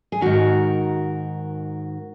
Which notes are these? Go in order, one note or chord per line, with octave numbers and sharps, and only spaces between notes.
G#4
G#2 D#3 F#4 A#4